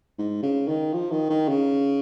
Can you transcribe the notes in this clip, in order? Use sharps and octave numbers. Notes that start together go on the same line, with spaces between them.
G#2
C#3
D#3
F3
D#3
D#3
C#3